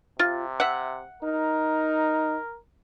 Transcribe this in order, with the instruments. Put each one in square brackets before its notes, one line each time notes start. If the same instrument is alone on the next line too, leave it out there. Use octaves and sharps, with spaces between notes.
[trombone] C3 [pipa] F4
[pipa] E5 F#5
[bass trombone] D#4 [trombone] A#4